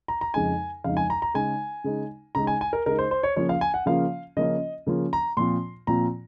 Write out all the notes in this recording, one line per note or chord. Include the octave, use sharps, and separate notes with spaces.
A#5
A#5
F2 C#3 G#3 D#4 G#5
F2 C#3 G#3 D#4 F5
G#5
A#5
A#5
C#3 G#3 D#4 G#5
C#3 G#3 D#4
C#3 G#3 D#4 A#5
G#5
G#5
A#4
C#3 G#3 D#4 A#4
C5
C5
C#5
C#3 F3 A#3 C#4 F4 C#5
F5
G#5
F#5
C#3 F3 A#3 C#4 F4 F5
C#3 F3 A#3 C#4 F4 D#5
C#3 F3 A#3 C#4 F4
A#5
A#2 F3 C4 F4 C6
A#2 F3 C4 F4 A#5